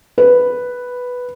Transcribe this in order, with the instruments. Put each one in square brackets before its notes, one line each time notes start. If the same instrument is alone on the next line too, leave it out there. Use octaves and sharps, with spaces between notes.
[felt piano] B4